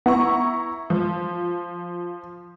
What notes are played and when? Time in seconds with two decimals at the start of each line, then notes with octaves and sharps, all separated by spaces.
0.06 B3 E4 A#5 C#6
0.90 F3